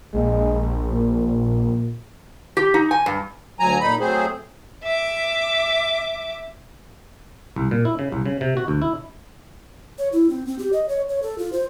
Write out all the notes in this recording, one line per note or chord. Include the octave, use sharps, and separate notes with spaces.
A#1 G#3
A#2
G4
D#4
G#5
G2
D2 F#3 G#5 A#5
A#2 D#4 B5
F#3 A3 C4 G#4 C5
E5 D6
C2
A#2
E4
C#3
C2
C#3
C3
F#4
D2
E4
C#5
E4
C4
C4
G4
D#5
C#5
C#5
A4
F4
C5